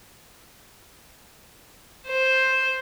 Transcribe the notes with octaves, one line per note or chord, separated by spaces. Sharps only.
C5